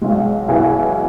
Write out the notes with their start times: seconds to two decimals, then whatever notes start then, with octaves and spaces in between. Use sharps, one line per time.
0.02 B1 B2 G#3
0.48 B1 B2 B3 E4 G#4